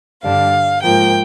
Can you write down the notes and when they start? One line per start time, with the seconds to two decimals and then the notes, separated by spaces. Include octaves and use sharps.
0.23 G2 D3 G3 D4 F5
0.82 G#2 F3 A#3 G5